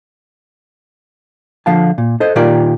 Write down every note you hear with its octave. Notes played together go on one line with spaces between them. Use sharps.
D3 F3 F5 A5
A#2
A4 C5 D#5
A#2 D#3 F4 G4 A#4 D5